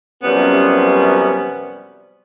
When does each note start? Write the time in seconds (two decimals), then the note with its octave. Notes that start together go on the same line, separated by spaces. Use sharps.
0.23 F#2 C3 F3 G3 B3 C#4